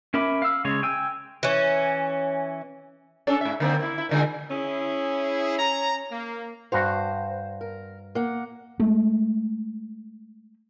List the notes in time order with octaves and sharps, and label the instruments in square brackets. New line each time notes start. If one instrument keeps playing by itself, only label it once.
[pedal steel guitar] C#4 A#4 E5 B5 D6
F5 E6
C#3 G#3 C#5
G5 G#5 E6
[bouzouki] E3 C#4
[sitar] C#4 D4 A4
G#2 E5
D3 A#3 C4
A#3 E4
E4
A#2 D3 G#3
[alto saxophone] C#4 [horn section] E4 G#4
[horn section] A#5
A#3
[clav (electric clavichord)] G2 F#4 F5 [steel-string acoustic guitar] C5
[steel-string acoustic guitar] A#4
A#3 F#5
[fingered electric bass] G#3 A3